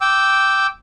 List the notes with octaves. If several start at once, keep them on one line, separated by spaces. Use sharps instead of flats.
G5 D6 E6